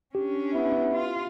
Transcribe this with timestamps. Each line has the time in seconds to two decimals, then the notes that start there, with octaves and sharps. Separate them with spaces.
0.15 C#4 D4 G4
0.53 B3 E4
0.93 F4